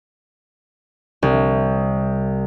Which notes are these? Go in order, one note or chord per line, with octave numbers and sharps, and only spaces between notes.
C2